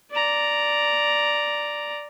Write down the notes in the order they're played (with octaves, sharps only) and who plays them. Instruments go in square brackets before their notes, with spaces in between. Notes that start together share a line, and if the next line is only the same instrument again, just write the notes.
[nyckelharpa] D5 A#5